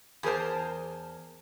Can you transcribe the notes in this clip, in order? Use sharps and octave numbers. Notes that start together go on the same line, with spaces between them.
E2 G#4 A#4 C5 A5